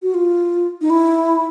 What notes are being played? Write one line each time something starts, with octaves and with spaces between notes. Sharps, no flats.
F#4
F4
D#4
E4